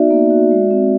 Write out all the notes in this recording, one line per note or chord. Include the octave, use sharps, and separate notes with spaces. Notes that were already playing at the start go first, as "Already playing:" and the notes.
Already playing: B3 D#4 F#4 D5 E5
A#3
F#4
G#3
C4